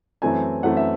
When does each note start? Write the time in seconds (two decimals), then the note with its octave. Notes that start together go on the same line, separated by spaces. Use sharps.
0.22 F#2 E3 A3 C4 G#5
0.63 F#2 E3 A3 C4 F#5
0.77 E5